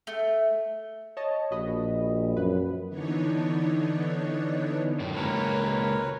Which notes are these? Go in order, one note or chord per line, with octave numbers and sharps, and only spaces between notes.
A3
C#5 D#5 A5
A#1 F#4 D#5 B5
F#2 B4
D3 E3 B3 D4 D#4 C#5
F#2 A2
C#2 A#3 A#4 B4 C#5